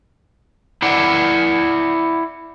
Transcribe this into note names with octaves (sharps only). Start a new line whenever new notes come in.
E4 D5 F#5